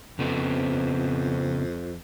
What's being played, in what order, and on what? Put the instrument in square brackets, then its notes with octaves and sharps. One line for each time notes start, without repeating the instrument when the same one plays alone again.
[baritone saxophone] F2 [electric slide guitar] C#3 B3 C4